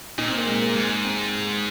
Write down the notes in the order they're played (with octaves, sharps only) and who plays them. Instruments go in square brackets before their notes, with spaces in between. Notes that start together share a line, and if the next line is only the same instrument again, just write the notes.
[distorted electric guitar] A#2 [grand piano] D#4
[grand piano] C4
A#3
G#3
A#3
[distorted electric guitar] G#2
[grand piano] C4